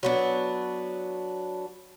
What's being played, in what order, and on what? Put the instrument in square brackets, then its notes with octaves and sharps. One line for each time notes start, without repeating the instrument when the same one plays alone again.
[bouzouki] F#3 B3 D4